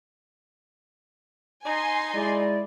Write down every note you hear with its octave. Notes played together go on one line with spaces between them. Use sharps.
D#4 G#5 C6
G#3 E4 D5